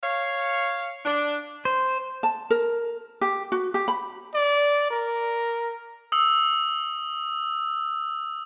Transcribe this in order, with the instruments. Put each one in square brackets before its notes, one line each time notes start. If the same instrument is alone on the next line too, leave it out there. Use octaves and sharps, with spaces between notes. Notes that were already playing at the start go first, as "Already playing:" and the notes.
[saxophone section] C#5 F5
D4
[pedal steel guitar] C5
[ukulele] A5
A#4
G4
F#4
G4
B5
[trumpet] D5
A#4
[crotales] D#6 E6